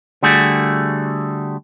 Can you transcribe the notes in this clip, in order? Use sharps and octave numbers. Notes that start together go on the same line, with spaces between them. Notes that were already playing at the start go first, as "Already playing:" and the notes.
D3 G3 A3 F#4 G#4